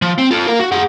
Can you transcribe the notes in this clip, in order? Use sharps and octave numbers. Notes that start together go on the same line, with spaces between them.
F3
C4
F4 A4
A#4 F5
F#4
G#4 F#5